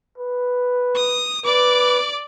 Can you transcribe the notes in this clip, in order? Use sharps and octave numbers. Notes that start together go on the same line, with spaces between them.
B4
D#6
B4 D5 D6